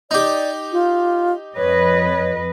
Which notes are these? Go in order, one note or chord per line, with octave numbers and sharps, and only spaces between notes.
D#4 G4 D5
F4
F2 B4 C#5 D#5